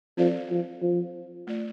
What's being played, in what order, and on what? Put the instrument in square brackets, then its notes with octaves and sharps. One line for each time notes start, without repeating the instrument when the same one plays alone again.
[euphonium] F3 [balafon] C4 A4 D5
[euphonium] F3
F3
[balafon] A3 F4 D5